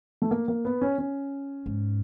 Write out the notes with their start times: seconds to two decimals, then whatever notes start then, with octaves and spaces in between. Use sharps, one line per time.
0.22 A3
0.31 A#3
0.48 A#3
0.65 B3
0.81 C#4
0.98 C#4
1.66 G#2